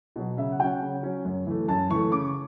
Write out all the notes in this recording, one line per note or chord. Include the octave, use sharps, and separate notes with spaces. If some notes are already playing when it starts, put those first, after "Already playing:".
B2 F#3
C#3 E5
F#5
F#3 C#4 F#5 G5
C#3
F#3 C#4
F#2
E3 A3
F#2 A5
E3 A3 C#6
C#3 D6